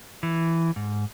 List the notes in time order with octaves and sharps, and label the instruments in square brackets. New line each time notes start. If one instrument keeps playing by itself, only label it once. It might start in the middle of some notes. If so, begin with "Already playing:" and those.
[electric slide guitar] E3
G#2